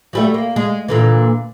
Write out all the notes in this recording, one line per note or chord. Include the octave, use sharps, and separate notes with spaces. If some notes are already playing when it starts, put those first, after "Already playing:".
F#3 G3 A3
A#3
G#3
A#2 D3 E3